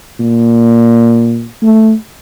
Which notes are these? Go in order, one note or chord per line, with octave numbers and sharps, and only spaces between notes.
A#2
A3